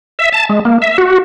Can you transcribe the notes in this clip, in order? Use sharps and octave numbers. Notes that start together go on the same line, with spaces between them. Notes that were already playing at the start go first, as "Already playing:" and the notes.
E5
A5
G#3
A#3
E5
F#4